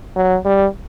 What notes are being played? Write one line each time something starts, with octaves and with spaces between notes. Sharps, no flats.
F#3
G3